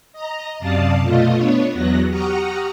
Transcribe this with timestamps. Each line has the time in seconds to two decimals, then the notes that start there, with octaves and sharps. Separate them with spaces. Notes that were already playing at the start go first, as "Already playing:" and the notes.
0.13 D#5 A#5
0.60 F#2 C3 D5 F5 A5 D#6
1.01 B2 A3 F4 D#5
1.35 B3 D4 C#5
1.71 E2 F#3 B3 F#6 A#6
2.10 G4 F#5 A#5 C#6 D#6 F6